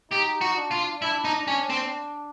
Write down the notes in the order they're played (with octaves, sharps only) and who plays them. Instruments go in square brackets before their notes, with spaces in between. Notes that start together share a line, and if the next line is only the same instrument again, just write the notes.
[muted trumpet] D#4 [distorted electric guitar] G4
[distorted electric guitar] F#4
[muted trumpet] D4
[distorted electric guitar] F4
[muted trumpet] D4 [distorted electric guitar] E4
[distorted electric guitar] D#4
C#4
C4